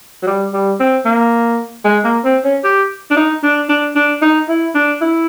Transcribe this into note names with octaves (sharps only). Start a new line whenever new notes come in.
F#3
G3
G3
C4
A#3
G#3
A#3
C4
C#4
G4
D4
D#4
D4
D4
D4
D#4
E4
D4
E4